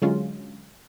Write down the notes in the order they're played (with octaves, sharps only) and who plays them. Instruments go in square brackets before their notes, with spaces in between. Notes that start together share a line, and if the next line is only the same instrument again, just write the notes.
[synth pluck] D3 F#3 G#3 C#4 F4